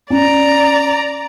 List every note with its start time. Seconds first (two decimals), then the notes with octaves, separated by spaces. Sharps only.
0.10 C#4 D5 A#5